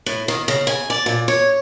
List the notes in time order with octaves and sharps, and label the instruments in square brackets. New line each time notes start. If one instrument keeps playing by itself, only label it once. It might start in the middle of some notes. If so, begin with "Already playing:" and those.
[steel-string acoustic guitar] A2
D#3
C#3
G#5
D5
A#2
C#5